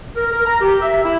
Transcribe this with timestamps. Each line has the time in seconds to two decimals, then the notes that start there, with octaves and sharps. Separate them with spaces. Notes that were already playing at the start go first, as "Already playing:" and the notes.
0.14 A#4
0.32 A#4
0.44 A#5
0.61 G4
0.80 E5
1.04 E4